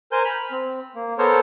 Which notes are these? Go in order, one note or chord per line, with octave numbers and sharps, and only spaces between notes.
A#4 C5 G#5 G6
B5 F6
C4
A#3
B3 A4 A#4 C5 C#5